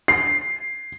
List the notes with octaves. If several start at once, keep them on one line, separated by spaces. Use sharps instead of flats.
C7